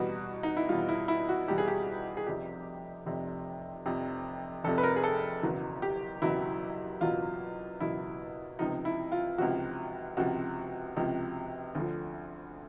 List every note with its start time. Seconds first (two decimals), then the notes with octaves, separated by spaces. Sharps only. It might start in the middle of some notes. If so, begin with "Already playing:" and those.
Already playing: E2 B2 G3 F#4
0.43 D#4
0.57 E4
0.69 E2 B2 G3 F4
0.89 E4
1.08 E4
1.29 F#4
1.48 E2 B2 G3 G4
1.58 G#4
1.68 G4
2.17 G#4
2.27 F1 F2 C3 G4
3.06 F1 F2 C3
3.85 F1 F2 C3
4.64 F1 F2 C3 A4
4.78 B4
4.83 A#4
4.96 G#4
5.04 A4
5.43 F#1 E2 B2 F#3
5.82 G4
6.22 F#1 E2 B2 F#3 E4
7.01 F#1 E2 B2 F#3 F4
7.80 F#1 E2 B2 F#3 E4
8.59 C#2 C3 F3 D#4
8.85 E4
9.12 F4
9.38 C#2 C3 F3 F#4
10.17 C#2 C3 F3 F#4
10.96 C#2 C3 F3
11.75 D2 D3 F3